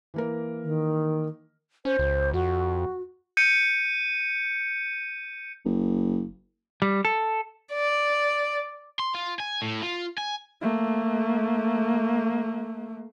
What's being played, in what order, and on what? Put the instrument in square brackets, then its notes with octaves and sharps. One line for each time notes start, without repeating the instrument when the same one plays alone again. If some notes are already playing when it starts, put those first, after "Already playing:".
[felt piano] E3 A#3 A#4
[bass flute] D#3
[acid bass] C#4 [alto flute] C5
[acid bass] C#2
[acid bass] F2 [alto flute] F#4
[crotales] G6 C#7 D#7
[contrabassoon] F#1
[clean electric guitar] G3
A4
[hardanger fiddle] D5
[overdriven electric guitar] C6
F4
G#5
A2
F4
G#5
[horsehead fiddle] A3 A#3